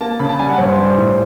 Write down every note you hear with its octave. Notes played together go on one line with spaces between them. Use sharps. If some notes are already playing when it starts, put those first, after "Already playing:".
A#3 A5
C#3 B5
A5
G3 G#5
F#5
G2 C#5
C5
G3
A2